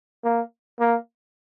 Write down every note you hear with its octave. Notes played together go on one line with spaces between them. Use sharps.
A#3
A#3